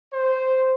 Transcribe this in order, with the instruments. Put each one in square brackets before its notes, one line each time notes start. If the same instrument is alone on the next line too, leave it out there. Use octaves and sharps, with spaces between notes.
[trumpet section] C5